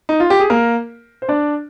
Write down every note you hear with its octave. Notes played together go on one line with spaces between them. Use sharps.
D#4
F4
G4
G#4
A#3 A#4
C5
D4 D5